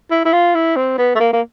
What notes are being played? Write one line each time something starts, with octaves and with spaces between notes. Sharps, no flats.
E4
E4
F4
E4
C4
B3
A3
A#3
A#3